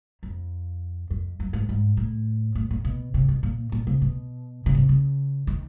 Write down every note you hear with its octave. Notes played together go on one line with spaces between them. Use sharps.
F2
F2
F#2
G#2
G#2
A2
A2
A#2
B2
C3
B2
A#2
A#2
C3
B2
C#3
C3
C#3
D#3